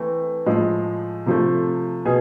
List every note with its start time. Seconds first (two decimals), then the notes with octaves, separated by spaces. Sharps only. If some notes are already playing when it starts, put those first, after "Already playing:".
Already playing: E3 A3 C4
0.46 A2 F3 G#3
1.26 C3 F3 A3
2.05 B2 G#4